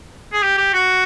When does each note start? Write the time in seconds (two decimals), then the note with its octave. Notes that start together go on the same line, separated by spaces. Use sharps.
0.33 G#4
0.42 G4
0.58 G4
0.74 F#4